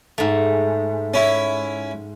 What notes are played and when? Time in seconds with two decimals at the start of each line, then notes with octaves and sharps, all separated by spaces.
0.18 G#2 A3
1.14 C#4 E4